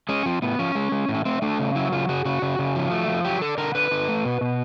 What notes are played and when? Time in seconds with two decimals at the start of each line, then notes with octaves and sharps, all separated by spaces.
0.09 G#3 C#4
0.26 F3 C4
0.42 A2 B3
0.59 F3 C#4
0.75 G#3
0.92 G#3
1.09 A2
1.14 C#4
1.25 A3 C4
1.42 A3 D4
1.59 C#3
1.75 F#3 E4
1.92 C#3 F4
2.09 C#3 F#4
2.25 C#3 F#4
2.42 C#3
2.59 C#3
2.75 F3
2.91 A3
3.08 F3
3.25 F#3 G4
3.42 D3 A4
3.58 D3 A#4
3.75 D3 B4
3.91 D3
4.08 A3
4.25 B2
4.41 B2